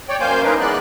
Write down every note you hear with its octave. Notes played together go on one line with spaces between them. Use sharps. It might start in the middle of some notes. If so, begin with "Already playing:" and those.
C#5 D5 G5
F#2 A#3 C5 F5 G#5 G6
D4 D#4 A#4 B4
E3 G#3 B3 D5 F#6